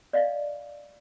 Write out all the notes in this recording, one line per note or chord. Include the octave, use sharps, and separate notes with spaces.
D5 D#5 F5